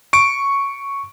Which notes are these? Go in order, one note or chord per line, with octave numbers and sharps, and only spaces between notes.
C#6 D7